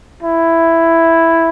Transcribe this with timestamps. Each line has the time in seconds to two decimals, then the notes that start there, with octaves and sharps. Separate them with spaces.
0.23 E4